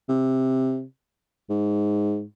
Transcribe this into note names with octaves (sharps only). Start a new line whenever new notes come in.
C3
G#2